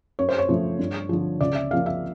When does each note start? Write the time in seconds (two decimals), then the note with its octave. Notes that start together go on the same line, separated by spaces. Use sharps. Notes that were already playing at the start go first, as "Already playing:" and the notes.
0.19 F#2 C#5
0.29 C5
0.38 C#5
0.49 C#3 F3 A3
0.79 G2
1.09 D3 F3
1.41 C#2 D5
1.55 E5
1.71 C#3 F3 A#3 F5
1.86 E5